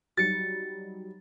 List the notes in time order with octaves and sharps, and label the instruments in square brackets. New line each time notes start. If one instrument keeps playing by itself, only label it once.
[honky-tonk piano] F#3 G3 D#4 [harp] A6 C#7